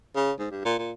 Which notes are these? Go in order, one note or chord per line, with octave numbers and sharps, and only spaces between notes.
C#3
G#2
G2
A#2
A#2